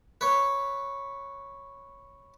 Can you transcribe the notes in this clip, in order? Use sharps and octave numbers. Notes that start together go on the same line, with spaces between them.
B4 C#5